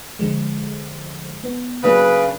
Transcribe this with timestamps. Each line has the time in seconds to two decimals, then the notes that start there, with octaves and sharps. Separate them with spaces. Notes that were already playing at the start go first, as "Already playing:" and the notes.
0.19 D3 F3 G#3
1.44 B3
1.84 C#3 F#3 A#3 D4 B4